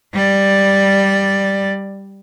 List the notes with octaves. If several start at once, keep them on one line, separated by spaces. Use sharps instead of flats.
G3 D5